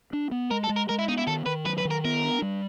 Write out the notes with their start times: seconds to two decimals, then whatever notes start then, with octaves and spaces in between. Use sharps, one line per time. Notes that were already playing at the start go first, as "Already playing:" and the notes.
0.13 D4
0.31 B3
0.51 G#3 A#4
0.64 A4
0.69 G#3
0.76 A#4
0.89 G#3 A#4
0.99 E4
1.08 B3 D#4
1.18 E4
1.27 D#3 A4
1.46 D#3 B4
1.65 F#3 B4
1.78 B4
1.85 D#3
1.91 A#4
2.05 B3 A#4
2.23 D4
2.42 G3